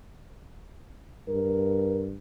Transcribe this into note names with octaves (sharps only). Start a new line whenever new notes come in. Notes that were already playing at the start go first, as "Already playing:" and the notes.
G2 A#4